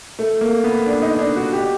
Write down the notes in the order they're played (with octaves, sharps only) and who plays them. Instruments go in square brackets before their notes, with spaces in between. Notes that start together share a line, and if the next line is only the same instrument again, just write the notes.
[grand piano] A3
A#3
B3
D4
D#4
D4
F#4
G4